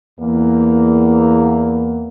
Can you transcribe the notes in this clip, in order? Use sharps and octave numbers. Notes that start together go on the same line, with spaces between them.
E2 A#3